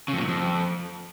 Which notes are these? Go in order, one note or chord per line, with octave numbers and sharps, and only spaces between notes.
C#3
F2
A#2
F#2
F2